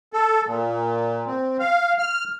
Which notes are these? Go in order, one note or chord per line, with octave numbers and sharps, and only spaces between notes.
A4
A#2
C4
F5
F6